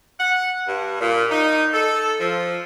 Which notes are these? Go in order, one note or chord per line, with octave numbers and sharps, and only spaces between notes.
F#5
G2
A#2
D#4
A4
F3